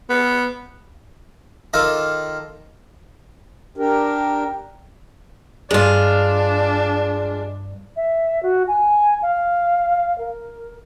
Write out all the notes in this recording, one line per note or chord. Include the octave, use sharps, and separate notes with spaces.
B3
D#3 F4 A4 D#5 D6
D4 G4 A#4
G2 G#3 D4 F4 D5
E5
F#4
G#5
F5
A#4